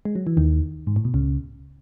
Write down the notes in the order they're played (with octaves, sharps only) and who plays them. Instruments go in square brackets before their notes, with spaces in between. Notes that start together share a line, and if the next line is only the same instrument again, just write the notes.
[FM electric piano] G#3
F#3
E3
D#2 D#3
G#2
A2
B2
C#2 C#3